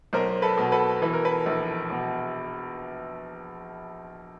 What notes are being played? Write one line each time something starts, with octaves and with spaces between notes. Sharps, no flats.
B1 A#4 C5
A4 B4
B2
A4 B4
E3 B4
A#4
A4 B4
A#1
B2